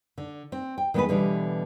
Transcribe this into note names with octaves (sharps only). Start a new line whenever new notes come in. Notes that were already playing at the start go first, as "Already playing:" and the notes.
D3
C4
G5
D#3 G#3 B3 D#4 G#4 B4
B2 D3 E3 G3